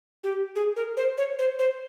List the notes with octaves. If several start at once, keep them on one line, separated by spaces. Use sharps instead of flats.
G4
G#4
A#4
C5
C#5
C5
C5